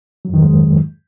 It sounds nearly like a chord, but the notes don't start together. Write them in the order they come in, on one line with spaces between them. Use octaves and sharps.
F#3 F2 D#3 G#2 G#3